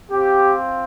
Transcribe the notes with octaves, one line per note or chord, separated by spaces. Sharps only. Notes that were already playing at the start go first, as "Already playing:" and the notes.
C4 F4 G4